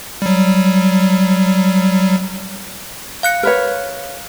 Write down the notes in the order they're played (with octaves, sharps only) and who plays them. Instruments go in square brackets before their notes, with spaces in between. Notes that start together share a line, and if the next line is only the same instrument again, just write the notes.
[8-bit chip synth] F#3 G3
[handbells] F5 F#6 C#7
[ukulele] A#4 B4 C#5